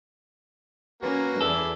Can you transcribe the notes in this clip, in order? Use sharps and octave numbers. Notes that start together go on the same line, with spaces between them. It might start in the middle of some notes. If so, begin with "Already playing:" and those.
A#3 C#4 F#4 A#4 B4
E2 E4 G#4 A4 D5